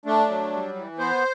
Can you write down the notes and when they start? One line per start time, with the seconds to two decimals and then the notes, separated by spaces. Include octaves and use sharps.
0.05 A3 D4
0.29 F#3
0.52 G3
0.76 E3
0.99 B3 C5